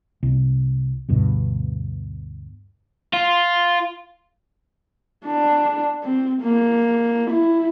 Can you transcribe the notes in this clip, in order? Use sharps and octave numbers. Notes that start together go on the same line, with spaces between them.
C2
D2 G2 B2
F4
D4
C4
A#3
E4